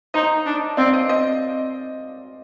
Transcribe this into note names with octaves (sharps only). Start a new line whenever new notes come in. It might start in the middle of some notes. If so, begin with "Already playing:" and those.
D#4 C5 D#5
D4
C4 D5 F5
C5 D#5
C5 D#5